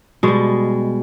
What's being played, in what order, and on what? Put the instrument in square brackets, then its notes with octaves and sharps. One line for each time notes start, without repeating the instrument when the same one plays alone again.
[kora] B2 G3 G#3